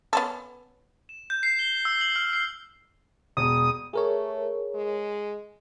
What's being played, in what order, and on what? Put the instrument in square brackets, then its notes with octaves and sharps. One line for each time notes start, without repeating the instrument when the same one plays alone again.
[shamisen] B3 C#4 A4
[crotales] E7
G6
C7
G7
E6
F#7
F6
C7
[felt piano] E1 [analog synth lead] D#6
[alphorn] A3 [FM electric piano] G#4 A#4 C#5
[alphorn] G#3